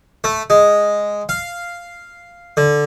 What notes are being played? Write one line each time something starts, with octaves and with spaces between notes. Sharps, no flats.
A3
G#3
F5
D3